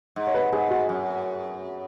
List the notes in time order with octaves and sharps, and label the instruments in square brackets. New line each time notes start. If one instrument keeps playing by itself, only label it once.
[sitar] G#2
[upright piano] C#5
B4
[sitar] G#2 [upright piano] G#4
[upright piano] F#4
[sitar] F#2